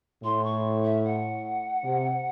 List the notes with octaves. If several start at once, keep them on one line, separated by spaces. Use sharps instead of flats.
A2 C6
C#6
E5
F#5
C3